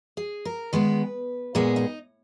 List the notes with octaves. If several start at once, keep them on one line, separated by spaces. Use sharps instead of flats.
G#4
A#4
D#3 G#3 B3 B4
A#2 G#3 B3 G#4
D#4